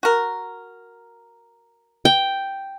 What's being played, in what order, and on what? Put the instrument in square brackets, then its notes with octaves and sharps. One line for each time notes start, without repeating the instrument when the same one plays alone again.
[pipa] F#4 A#4
[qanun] G5